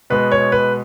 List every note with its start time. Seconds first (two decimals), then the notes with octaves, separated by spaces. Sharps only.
0.10 B2 G#3 B3 B4
0.32 C#5
0.52 B4